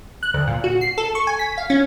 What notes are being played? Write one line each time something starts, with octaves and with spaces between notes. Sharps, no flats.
F#6
D2
A#2
F#4
C7
A4
C#6
G#5
B6
F5
C#4